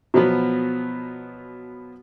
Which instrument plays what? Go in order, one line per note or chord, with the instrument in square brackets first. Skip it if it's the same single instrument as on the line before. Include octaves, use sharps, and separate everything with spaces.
[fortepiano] B2 F3 F#3 B3